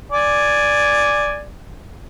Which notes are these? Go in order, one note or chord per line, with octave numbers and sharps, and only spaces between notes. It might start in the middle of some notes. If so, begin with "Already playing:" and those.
D5 G#5